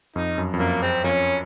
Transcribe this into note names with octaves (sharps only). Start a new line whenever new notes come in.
F2 D#4
F#2
F2
F#2 A#3
G#3 C4
F2 A#3 C#4